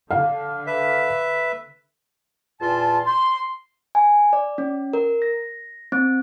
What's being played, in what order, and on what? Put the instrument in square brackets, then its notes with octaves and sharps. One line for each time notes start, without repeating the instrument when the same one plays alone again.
[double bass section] D3 [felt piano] F5
[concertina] B4 E5
[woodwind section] E2 A#2 F4 A5
C6
[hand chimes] G#5
D5
C#4
A#4
A#6
C4